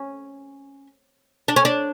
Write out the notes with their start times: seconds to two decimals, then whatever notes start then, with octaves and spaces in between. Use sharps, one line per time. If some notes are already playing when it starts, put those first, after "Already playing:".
Already playing: C#4
1.48 D4
1.56 C#4
1.65 D4